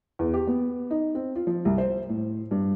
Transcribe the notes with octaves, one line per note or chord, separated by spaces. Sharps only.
E2
G4
B3
D#4
C4
F4
F3
C2
C5
A2
G2